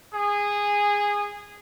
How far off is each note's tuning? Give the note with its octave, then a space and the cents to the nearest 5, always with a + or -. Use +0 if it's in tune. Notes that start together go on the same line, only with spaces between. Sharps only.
G#4 -15